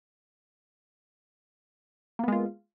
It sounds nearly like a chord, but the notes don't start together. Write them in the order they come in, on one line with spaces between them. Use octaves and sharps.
A#3 B3 G#3 F4